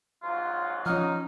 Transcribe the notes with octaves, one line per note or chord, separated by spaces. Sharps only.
A#1 G#2 F#3 F4
F3 C#4 D#4 F6